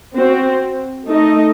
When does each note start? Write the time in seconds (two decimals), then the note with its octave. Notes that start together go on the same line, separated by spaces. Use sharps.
0.15 C4 F#4 C5
1.07 A3 D#4 A4 D#5